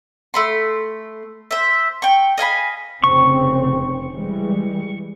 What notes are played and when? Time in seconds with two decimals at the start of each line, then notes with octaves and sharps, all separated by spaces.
0.34 A3 B5 C6
1.51 C5 E5
2.02 G5 C#6
2.38 D#5 F5 G#5 B5
3.04 F1 C#3 C4 C#6
4.14 E3 G3 G#3